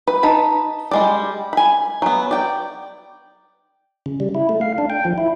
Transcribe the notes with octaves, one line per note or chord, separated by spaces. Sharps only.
B4
D#4 A5 B5
G3 G#3 D5
G#5 B5
F#3 B3
D5 G5
C#3
G3
E4
A3
F5
D4
G5
F3
E4